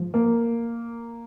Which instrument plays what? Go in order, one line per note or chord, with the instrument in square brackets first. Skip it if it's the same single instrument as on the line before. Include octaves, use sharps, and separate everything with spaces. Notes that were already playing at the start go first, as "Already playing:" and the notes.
Already playing: [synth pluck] G#2 F3
[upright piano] A#3